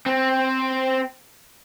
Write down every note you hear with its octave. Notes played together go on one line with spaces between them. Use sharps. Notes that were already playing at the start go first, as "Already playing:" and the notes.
C4